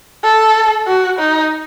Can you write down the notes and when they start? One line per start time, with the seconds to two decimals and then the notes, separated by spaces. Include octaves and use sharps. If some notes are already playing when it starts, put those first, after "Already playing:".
0.24 A4
0.87 F#4
1.19 D#4